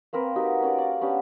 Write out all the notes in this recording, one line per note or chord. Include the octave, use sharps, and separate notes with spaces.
A#3 C4 A#4 B4
D#4 F#4 G4
A#3 C#4 A#4 D5
D5 F5
B3 C#4 D4 G4